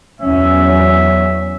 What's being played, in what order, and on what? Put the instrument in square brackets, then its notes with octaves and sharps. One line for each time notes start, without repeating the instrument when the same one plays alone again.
[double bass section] E2 F#3 C#4 [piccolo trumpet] E5